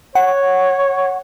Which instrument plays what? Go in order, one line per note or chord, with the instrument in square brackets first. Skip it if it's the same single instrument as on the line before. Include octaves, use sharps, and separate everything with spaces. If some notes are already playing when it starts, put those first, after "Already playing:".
[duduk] C#5 [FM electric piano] F#5